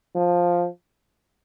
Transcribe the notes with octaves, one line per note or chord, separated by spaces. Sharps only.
F3